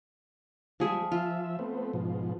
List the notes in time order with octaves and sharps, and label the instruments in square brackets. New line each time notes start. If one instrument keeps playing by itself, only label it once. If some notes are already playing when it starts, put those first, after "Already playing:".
[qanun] F3 G#4 E5 [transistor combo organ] G3 G#3
[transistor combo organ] F3 E5 [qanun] F4
[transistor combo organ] A3 B3 C4
G#2 B2 F3